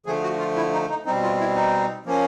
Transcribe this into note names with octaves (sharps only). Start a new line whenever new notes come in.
D3 F3 A3 G#4
F#4
F4
E4
D#4
D#4
B2 G3 C4 D#4
F4
E4
D#4
F3 A#3 C#4